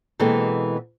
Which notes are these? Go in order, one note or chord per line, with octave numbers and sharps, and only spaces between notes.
B2 E3 G#3 A#3 C4 A4